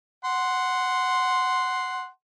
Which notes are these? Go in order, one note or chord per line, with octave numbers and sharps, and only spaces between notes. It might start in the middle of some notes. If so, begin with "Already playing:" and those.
F#5 C6